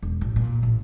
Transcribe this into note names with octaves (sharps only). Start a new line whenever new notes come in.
E1
A1
A#2
A1